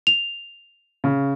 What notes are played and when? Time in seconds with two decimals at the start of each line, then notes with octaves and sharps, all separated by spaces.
0.07 F7
1.04 C#3